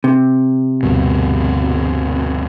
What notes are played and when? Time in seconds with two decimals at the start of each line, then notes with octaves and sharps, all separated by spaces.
0.04 C3
0.83 D2 G2 B2